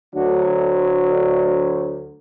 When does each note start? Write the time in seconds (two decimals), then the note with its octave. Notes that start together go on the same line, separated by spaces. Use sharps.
0.13 D2 D3 F#3 A3 D4 F#4
1.08 A3 D4